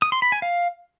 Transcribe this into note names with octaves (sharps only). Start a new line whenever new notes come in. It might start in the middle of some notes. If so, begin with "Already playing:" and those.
D#6
C6
B5
G#5
F5